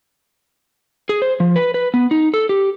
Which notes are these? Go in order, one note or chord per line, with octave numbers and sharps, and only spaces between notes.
G#4
C5
F3
B4
B4
B3
D#4
A4
G4